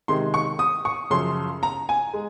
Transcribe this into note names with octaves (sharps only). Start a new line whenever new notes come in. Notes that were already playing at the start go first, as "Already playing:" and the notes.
C3 D#3 G#3 C6
C#6
D#6
C#6
F#2 C#3 F3 C6
A#5
G#5
G#3